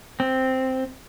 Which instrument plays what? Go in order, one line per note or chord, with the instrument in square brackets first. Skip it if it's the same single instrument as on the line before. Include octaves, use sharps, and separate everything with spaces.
[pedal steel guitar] C4